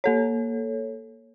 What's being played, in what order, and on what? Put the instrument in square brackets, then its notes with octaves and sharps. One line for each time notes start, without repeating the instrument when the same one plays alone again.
[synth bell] A#3 A4 C#5